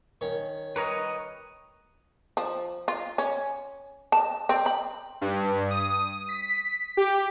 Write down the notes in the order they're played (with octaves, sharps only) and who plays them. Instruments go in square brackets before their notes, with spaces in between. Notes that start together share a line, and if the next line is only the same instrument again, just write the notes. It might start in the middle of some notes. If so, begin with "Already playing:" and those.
[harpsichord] D#3 C#4
[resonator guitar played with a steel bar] G3 A#4 [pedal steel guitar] B4 C#5 D#5
[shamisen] F3
F4
C#4
A5
C4
B5
[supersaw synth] G2
D#6
B6
G4